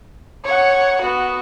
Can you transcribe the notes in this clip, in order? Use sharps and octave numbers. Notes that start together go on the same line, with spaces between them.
C#5 F#5
B3 F#4